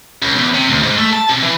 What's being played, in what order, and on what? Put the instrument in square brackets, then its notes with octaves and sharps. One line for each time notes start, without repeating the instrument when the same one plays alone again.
[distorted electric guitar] C#2
E2
C3
D2
G#2
A3
A5
C3
E3